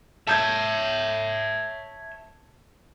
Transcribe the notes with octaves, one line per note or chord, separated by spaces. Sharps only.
C#5 E5 A5 G6 G#6